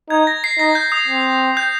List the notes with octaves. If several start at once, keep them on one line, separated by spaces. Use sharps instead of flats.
D#4 G#6
A#6
C7
D#4 A#6
G6
D#6
C4
G6